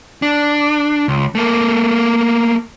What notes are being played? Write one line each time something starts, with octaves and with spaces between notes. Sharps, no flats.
D4
C#2
A3 A#3